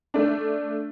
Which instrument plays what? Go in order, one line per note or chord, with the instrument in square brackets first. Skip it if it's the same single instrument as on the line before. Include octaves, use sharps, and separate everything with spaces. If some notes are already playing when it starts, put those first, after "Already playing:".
[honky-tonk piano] A3 D4